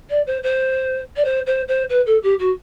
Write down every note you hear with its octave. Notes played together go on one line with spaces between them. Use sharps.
D5
C5
C5
D5
C5
C5
C5
B4
A4
G4
F#4